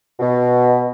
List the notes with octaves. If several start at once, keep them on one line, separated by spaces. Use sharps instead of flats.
B2